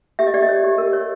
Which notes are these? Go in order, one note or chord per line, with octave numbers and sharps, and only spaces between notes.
G4 E5
D#5
G4 D5
D#5
C#5
G4
A#4
C#5